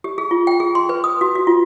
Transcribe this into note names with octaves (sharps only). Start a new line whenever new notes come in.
G4
G#4
F4
G5
G#4
C6
B4
D#6
F#4
F#4
F4